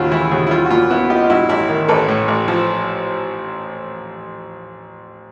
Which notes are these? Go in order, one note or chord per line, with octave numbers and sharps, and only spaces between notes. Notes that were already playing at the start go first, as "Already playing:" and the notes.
Already playing: D#2 C#3 F4 F#4
E3 E4
D#2 F#4 G#4
E4
G3 F4
F#4
A#2 F4
B3 E4 F#4
D#4 F4 G4
F4
G2 E4 F#4
A1 E4
D#3
A1 A4 B4
A2
A1
F3